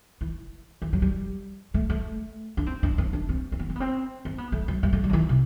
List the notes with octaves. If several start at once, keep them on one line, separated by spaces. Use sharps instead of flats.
E3
E3
F#3
G3
A3
A3
D4
C4
D4
C4
D4
C4
C4
B3
C4
B3
C4
C4
B3
A3
F#3
G3
A3
G3
F#3
E3
C3